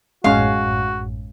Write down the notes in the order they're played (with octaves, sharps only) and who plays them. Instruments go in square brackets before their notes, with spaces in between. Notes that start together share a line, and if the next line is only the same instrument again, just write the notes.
[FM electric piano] A1 F#2 A2 [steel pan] G#3 C#4 [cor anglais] F#4 [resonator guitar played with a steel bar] F5